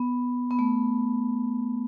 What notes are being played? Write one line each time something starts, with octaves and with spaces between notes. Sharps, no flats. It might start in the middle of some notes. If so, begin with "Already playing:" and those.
Already playing: B3
B3
A3